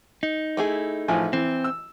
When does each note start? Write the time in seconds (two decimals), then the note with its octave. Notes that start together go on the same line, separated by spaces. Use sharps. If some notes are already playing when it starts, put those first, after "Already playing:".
0.23 D#4
0.57 A3 E4 G#4
1.08 A1 F3 G#5
1.33 E3 C4
1.64 E6